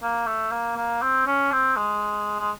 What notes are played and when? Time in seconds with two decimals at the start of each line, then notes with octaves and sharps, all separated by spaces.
0.03 A#3
0.27 A3
0.52 A#3
0.77 A#3
1.02 C4
1.27 C#4
1.52 C4
1.77 G#3
2.40 G#3